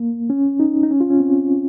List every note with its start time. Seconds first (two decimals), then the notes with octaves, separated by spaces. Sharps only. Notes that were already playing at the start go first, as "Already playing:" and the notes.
Already playing: A#3
0.30 C#4
0.60 D#4
0.83 D#4
0.91 C#4
1.01 F4
1.10 C#4
1.20 C4